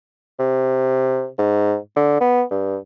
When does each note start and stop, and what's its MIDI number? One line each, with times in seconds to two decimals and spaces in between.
0.39 1.27 48
1.38 1.76 44
1.96 2.19 50
2.21 2.43 59
2.51 2.77 43